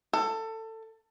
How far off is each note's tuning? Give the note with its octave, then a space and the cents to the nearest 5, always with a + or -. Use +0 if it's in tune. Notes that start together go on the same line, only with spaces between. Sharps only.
A4 +20